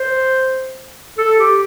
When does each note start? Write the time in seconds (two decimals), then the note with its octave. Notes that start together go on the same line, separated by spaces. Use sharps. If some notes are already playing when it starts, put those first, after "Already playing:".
Already playing: C5
1.18 A4
1.39 G4